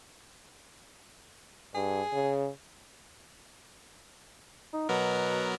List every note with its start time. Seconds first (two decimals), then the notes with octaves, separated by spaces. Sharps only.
1.75 G2 G#4
2.13 C#3
4.73 D#4
4.89 B2 F#3 B3 A#4